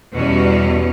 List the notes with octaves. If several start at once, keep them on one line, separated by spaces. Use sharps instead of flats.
E2 B2 G3 C#4 F#4